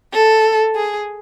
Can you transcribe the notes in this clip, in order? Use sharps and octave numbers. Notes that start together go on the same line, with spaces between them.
A4
G#4